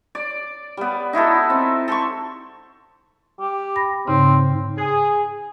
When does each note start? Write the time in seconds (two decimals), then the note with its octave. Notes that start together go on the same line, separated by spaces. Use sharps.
0.15 D5
0.77 G3 B3
1.13 D#4 E4 F#4 A4
1.50 C4
1.88 A4 C6 C#6
3.40 G4
3.76 B5 A#6
4.07 G#2 C#3 C4 D#4
4.78 G#4